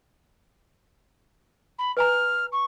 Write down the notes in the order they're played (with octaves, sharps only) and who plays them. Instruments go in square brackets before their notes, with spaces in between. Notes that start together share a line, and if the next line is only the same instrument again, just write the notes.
[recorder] B5
[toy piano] B4 G#5 A#5 [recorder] F6
[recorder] C#6